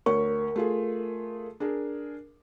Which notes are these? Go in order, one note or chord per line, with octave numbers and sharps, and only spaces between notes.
D2 A#4 C#5 C#6
A3 F4 G#4
D4 G#4 A#4